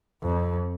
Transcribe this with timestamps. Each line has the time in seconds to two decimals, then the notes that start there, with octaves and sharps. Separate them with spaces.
0.22 F2